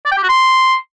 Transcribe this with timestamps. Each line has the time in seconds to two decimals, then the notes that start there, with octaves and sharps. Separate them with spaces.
0.06 D5
0.12 G5
0.17 G4
0.23 F#4
0.29 C6